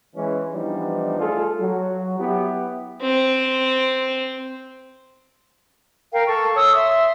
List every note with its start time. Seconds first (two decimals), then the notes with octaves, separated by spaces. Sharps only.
0.15 E3 G#3 C#4
0.52 E3 F3 G3 B3 D4 D#4
1.19 A3 F4 G#4 A4
1.60 F#3
2.19 B3 E4 G4
3.01 C4
6.13 A#4 F5 G5
6.28 A4 C#6
6.56 C#5 D#6 E6
6.76 E5 C6